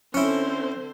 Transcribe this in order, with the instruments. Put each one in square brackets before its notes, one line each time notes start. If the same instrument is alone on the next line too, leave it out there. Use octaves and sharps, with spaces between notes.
[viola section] D3 C4 C5 [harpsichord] C#4 E4